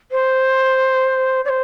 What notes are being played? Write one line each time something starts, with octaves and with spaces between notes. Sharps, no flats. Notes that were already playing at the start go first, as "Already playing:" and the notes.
C5
D5
C5